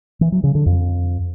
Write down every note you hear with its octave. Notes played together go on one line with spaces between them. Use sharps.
E3
F#3
C#3
D3
F2